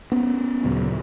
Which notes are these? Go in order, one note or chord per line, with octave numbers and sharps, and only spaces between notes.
B3 C#4
D2 A#2 C#3 F#3